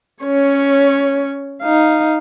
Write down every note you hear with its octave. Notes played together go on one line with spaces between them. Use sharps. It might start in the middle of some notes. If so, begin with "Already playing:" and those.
C#4 C#5
D#4 F5